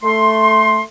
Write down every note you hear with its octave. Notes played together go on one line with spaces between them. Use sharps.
A3 C6